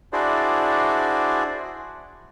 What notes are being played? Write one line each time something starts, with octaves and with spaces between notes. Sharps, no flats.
D4 E4 F#4 G#4 C5 D5